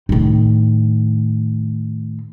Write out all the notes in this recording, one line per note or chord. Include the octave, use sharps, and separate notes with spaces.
A2 D#3